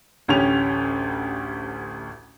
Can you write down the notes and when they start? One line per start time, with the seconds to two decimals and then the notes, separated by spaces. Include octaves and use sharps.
0.28 A1 D2 C#4 G4 F7